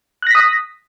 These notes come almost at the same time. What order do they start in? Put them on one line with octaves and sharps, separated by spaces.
F#6 A#6 B6 D#6